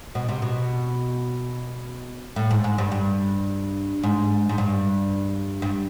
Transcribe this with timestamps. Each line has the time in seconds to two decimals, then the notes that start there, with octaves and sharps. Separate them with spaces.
0.15 B2
0.29 C3
0.42 B2
2.36 A2
2.51 G#2
2.64 G#2
2.78 G2
2.92 G2
4.03 G#2
4.49 G#2
4.58 G2
5.62 G2